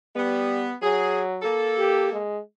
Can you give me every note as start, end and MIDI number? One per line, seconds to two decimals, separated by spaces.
0.16 0.69 55
0.16 0.74 59
0.82 1.44 54
0.82 1.20 68
1.42 2.17 58
1.42 2.17 69
1.78 2.08 67
2.13 2.40 56